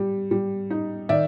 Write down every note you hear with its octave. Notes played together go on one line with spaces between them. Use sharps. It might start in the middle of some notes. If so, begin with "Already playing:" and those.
Already playing: G3
G3
D#4
D#3 D5 E5